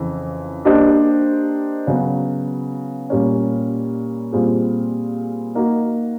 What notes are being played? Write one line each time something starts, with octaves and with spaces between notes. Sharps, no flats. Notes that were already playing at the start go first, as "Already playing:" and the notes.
Already playing: F2 C#3 E3
A#3 D4 G4 C5 D#5
C#3 F#3 B3
A#2 G3 A#3 C#4
A#2 G3 C4 F4 G#4
A#3 D#4 F#4